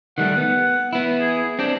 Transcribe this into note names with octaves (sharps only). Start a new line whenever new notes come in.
D#3 G3 A3 F#5
B3
B3 E4
G#4
C4 D4 G4